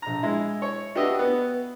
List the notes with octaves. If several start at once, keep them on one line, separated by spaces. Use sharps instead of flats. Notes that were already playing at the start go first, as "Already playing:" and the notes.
A#1 A#5
G#3 E4
C#5
D4 F#4 G4 B4 D#5 E5
B3